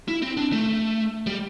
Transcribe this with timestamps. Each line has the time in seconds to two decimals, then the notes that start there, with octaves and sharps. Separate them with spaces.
0.08 E4
0.22 C4
0.37 D4
0.52 A3
1.27 G3